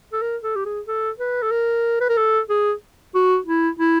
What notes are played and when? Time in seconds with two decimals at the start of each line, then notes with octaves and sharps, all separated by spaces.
0.13 A4
0.22 A#4
0.44 A4
0.55 G4
0.65 G#4
0.87 A4
1.19 B4
1.43 A4
1.51 A#4
2.01 B4
2.09 A#4
2.17 A4
2.49 G#4
3.15 F#4
3.46 E4
3.79 E4